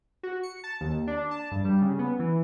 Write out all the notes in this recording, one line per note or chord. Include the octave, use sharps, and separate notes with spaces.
F#4
C#7
A5
D#2
D4
A5
G2
G3
C#3
B3
E3